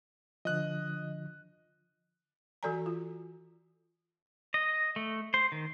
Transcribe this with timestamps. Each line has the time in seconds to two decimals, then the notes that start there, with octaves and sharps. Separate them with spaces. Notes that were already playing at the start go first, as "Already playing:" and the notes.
0.45 D3 F3 D#5 F#6
2.63 E3 F#4 A4 D5 G#5 A#5
2.86 F4
4.54 D#5
4.96 A3
5.34 C5
5.52 D#3